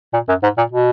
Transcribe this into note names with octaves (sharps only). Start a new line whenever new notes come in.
A#2
F#2
G#2
A#2
B2